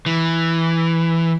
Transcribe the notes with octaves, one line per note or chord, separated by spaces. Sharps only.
E3